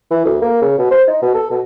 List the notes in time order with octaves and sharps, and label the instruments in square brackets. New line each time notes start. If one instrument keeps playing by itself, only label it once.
[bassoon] E3
D2
A#3
C#3
B2
C5
D#4
B2
A4
B2